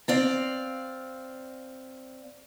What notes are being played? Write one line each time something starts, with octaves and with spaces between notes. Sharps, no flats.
C4 D5 F5